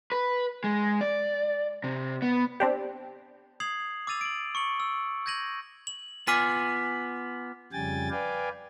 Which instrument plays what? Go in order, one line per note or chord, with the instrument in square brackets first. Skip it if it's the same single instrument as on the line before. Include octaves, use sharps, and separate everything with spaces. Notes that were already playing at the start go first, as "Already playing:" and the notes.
[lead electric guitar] B4
G#3
D5
C3
B3
[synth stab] C4 D4 G4
[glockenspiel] D#6 G#6 C7 F7 F#7
D6 E6 A6 D#7 F7
D7 F#7
C#6 C#7 F#7
E6
G6 G#6 A#6 D#7 F#7
F#7
[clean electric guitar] B3 F4 G#5 [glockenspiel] D6 F6 B6
[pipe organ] F2 C#3 G3 G5 G#5 A6
B4 D5 F5 G5 G#5